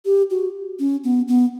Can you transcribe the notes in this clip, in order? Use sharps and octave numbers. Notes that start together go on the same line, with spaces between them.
G4
F#4
C#4
B3
B3